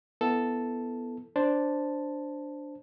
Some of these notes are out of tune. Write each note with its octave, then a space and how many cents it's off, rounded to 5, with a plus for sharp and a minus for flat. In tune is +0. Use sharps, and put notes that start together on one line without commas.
B3 +0 E4 +10 A4 +0
D4 +0 C5 +0 A5 +0